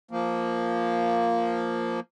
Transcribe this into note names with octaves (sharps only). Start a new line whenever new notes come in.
F3 A#3